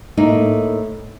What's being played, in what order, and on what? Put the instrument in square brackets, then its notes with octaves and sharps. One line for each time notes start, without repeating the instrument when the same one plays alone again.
[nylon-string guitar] A2 A#3 D#4